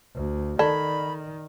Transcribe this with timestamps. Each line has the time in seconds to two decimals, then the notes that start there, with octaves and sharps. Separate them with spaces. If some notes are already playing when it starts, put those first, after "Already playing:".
0.14 D2
0.59 D#3 A4 D5 B5